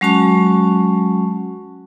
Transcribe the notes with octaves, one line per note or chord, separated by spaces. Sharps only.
F#3 G#3 C#4 F#4 A5 C#6